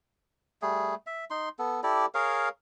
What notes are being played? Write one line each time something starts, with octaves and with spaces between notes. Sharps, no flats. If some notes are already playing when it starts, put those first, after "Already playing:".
G3 A3 G#4
E5
D#4 C6
B3 A4
E4 G4 A4 D5
G#4 A#4 C#5 F5